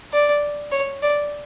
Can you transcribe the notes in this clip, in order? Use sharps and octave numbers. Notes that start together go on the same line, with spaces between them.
D5
C#5
D5